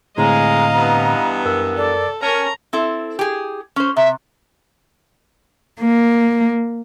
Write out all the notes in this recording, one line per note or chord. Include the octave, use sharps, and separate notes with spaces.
A2 D3 G#3 C4 D#5 F5 A#5
G2 E3 B3
F#2 A#4 E6
A4 D5
C#4 A#4 C#5 A5 A#5
C4 E4 A4
G4 G#4
C#4 C5
C3 E5
A#3